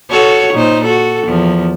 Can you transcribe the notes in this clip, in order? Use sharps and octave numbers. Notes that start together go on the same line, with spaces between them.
F#4 A4 C#5
A#2 D#4 C5
F#4 A4
E2 F3